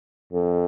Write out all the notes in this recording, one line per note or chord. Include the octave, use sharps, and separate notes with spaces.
F2